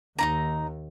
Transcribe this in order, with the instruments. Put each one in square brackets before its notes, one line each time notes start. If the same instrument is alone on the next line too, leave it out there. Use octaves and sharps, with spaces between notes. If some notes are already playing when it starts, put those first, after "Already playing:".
[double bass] D#2 [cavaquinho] D#4 E4 A#5